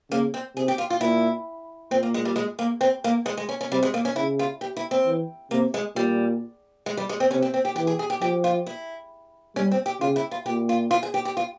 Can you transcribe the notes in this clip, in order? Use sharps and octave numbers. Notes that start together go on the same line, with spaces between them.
C#3 A#3
C4
C3 G#4
G4
F4
F4
A#2 E4
A#2 C4
A#3
G#3
G3
G#3
A#3
C4
A#3
G#3
G#3
C#4
C#4
C3 G3
G#3
A#3
C#4
C#3 E4
F4
G4
E4
C4
E3
C3 A#3
G#3
A#2 G3
G#3
G3
G#3
C4
C3 C#4
C4
C4
G4
E3 G4
G#4
G#4
G4
F3 G4
F4
E4
G3 C#4
C4
G4
C#3 F4
E4
F4
A#2 G4
F4
F4
G#4
G4
G4
F4